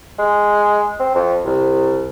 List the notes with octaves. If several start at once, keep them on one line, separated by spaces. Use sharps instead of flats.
G#3
C4
F2
C2